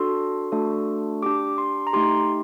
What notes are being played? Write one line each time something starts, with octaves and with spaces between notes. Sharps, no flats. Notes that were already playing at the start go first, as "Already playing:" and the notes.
Already playing: D4 F#4 A4 C6
A3 D4 F#4 A4
D4 G4 D6
C6
A#5
A3 D#4 G4 C6